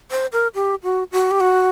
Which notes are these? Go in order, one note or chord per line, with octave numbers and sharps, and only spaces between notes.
C5
A#4
G4
F#4
F#4
G4
F#4